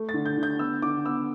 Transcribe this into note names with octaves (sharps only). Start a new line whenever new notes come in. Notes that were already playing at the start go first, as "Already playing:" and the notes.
Already playing: A3
A6
D3
G6
D3
G6
B3 E6
D3 D6
B3 E6